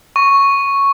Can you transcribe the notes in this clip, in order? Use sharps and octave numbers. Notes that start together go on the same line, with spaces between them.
C#6